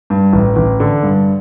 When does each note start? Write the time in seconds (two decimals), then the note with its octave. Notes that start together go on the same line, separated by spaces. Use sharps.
0.10 G2
0.33 A1
0.56 A1
0.80 D3
1.03 G2